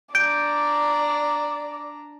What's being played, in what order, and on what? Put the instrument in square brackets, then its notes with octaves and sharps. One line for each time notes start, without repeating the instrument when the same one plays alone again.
[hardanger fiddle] D4 A#5 [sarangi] D5 [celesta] G6 D7